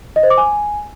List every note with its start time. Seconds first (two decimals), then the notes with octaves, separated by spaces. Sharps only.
0.16 D#5
0.23 C5
0.30 D6
0.38 G#5